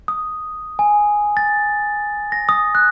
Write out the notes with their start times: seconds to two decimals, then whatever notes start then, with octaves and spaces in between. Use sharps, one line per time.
0.08 D#6
0.79 G#5
1.37 A6
2.32 A#6
2.49 D#6
2.75 F#6